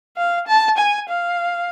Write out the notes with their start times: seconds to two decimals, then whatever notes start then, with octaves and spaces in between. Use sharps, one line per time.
0.17 F5
0.47 A5
0.77 G#5
1.09 F5